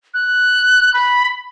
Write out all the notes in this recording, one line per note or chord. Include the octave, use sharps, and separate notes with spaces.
F#6
B5